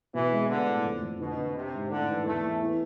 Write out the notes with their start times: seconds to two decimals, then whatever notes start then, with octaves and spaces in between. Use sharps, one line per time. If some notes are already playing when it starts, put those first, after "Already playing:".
0.14 B2 E3
0.31 G#3
0.49 D3 B3
0.67 A2
0.84 F2
1.02 F2
1.20 B2 D3
1.37 D3
1.55 C3 C4
1.73 G#2
1.90 A2 D3
2.08 E3
2.25 E2 A3
2.43 E2
2.61 E3